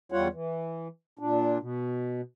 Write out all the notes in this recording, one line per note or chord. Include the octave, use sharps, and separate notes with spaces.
E2 G3 F4 C#5 F#5
E3
A#2 D4
B2